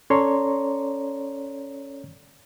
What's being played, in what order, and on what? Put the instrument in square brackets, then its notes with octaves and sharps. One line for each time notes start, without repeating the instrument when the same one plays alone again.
[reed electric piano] C#4 A4 C#5 D5 A#5 C6